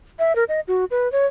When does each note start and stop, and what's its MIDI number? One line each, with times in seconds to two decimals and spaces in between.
0.19 0.35 76
0.36 0.44 70
0.49 0.60 75
0.68 0.85 66
0.91 1.10 71
1.12 1.26 73